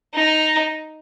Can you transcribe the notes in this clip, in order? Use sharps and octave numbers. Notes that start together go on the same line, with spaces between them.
D#4